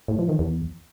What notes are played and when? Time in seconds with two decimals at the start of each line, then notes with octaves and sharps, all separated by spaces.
0.08 A2
0.19 F3
0.29 D#3
0.39 E2